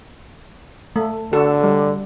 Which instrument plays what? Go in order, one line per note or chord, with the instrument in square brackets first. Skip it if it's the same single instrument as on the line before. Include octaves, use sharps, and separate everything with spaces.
[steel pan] A3
[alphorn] D3 [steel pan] F#4 A4
[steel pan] G3